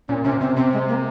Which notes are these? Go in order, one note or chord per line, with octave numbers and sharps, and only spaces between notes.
A#2 C#4
C3 C#4
C3 C4
C3 C4
G#3
A#3